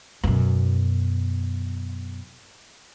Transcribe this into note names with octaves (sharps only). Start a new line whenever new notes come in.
F#2 B2